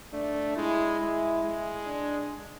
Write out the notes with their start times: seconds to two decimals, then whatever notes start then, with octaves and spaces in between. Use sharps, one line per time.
0.13 A3 D4
0.57 G#3 E4
1.00 G#3
1.43 G#3
1.87 D4